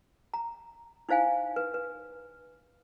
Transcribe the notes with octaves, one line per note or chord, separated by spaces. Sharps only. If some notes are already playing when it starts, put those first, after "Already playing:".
A#5
D#4 E4 C5 F5 G#5
B4
B4